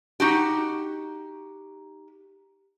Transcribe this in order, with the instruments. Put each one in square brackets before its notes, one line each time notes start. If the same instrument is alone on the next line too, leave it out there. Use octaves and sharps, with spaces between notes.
[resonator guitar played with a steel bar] D#4 F#4 G4